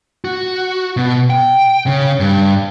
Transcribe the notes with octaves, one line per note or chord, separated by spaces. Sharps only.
F#4
B2
G5
C#3
G2